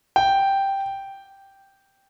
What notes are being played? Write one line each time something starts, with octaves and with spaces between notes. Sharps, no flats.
G5